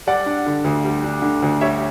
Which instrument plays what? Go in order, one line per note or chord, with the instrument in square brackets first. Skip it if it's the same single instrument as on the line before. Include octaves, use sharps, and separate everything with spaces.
[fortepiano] G3 [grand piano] D5 F#5
[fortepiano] D4
D3
D2
G3
D4
D3
D2
[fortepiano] G3 [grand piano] C#5 E5